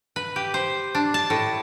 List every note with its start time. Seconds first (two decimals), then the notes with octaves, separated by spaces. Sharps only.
0.16 B4
0.36 G4
0.54 C5
0.95 D4
1.14 A5
1.30 A2